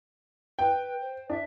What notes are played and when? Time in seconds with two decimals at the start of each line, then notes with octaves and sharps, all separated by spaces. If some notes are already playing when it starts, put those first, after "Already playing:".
0.59 B4 G5
1.01 C5
1.30 D4 E5